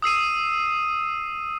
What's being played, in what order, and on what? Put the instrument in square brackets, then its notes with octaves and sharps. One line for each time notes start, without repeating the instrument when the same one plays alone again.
[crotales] D#6 E6 C7 D#7